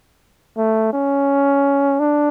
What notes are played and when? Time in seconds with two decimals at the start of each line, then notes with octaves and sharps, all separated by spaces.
0.57 A3
0.93 C#4
2.00 D4